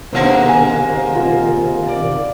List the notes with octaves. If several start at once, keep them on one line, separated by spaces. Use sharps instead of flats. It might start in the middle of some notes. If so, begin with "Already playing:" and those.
G#2 C3 D#3 A#3 B3 C5 F5 F#5
G#5
C5
F4
D5